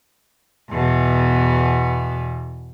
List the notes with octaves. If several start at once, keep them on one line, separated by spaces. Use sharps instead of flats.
E2 B2